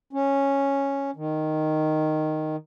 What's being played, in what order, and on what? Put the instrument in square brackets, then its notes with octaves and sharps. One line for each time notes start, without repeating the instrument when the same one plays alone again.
[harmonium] C#4
D#3